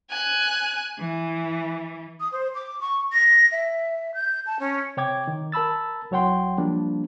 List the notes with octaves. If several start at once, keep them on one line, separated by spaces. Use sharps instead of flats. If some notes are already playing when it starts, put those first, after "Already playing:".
G#5 F#6
E3
D#6
C5
D6
C#6
A#6
E5
G6
A5
C#4
C3 C#5 G5 D6 G#6
D#3
A#4 A5 B5 E6 A6
C2 F#3 C#5 F#5 G5 C6
F3 G3 A#3 D4